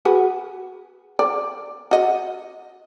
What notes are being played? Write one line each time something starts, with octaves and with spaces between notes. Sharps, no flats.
F#4 G#4 B4
D5
F#4 D#5